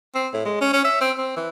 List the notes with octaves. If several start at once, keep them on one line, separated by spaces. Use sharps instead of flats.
C4
A2
G#3
C#4
C#4
E5
C4
C4
E3